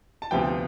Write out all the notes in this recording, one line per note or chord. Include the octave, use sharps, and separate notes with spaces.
A5
D2 C3 F3 B3 G5